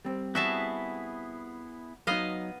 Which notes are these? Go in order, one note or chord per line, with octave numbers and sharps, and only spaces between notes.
G3 C4
B3 E4 F#4 G#4 E5 A5
F#3 B3 D#4 D#5 F5